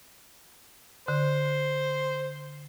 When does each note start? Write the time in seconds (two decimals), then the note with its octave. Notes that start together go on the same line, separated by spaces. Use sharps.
1.08 D3 C5